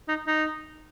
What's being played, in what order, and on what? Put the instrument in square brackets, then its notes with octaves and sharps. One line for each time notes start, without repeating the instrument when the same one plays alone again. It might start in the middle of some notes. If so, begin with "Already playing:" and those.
[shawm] D#4
D#4